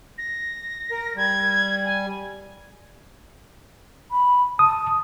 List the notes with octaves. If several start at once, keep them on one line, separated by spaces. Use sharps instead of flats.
A#6
A#4
G3 G#6
G#5
B5
A5 D#6